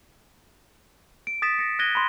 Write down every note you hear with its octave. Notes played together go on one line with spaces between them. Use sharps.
D7
D#6 A6 B6 E7
A#6 C#7
F#6 G#6 A#6 D#7 G7
B5 C6